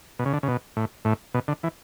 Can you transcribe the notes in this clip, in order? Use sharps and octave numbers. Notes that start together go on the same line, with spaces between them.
B2
C#3
D3
C#3
B2
A2
A2
B2
D3
E3